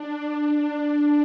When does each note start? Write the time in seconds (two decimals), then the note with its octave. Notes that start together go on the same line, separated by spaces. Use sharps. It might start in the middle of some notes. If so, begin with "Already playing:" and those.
Already playing: D4